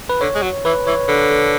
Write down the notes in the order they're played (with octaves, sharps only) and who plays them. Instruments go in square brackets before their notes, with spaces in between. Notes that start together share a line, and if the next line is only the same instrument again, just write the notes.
[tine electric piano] B4
[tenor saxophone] D3 [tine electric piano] C#5
[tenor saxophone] G#3
F#3
[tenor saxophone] E3 [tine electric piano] B4
[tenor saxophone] E3 [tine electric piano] C#5
[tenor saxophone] D3 [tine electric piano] B4
[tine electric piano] A4